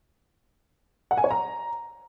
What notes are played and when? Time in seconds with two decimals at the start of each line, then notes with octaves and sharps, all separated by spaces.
1.11 F#5
1.17 G#5
1.24 C#5
1.31 A#5